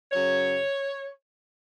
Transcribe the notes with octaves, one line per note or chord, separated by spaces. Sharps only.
F#2 C#3 F#3 C#5